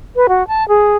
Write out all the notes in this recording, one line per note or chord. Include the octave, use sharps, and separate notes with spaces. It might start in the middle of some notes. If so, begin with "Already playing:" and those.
B4
F#4
A5
G#4